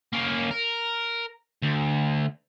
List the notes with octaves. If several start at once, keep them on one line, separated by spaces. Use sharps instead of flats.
A#3 C#4
A#4
D2